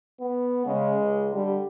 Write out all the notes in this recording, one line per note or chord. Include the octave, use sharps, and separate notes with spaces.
B3
C#3 G#3
C#2
D3 G3